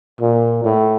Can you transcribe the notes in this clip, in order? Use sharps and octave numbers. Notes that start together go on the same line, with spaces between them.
A#2
A2